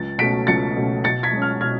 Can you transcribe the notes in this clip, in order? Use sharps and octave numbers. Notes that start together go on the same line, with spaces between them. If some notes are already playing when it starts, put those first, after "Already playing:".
Already playing: C#2 A6
B2 A3 C#4 B6 D7
C#2 A6 C#7
B2 A3 C#4
B2 A6 C#7
G#6 B6
G#3 C#4
F6 G#6
B2 F6 G#6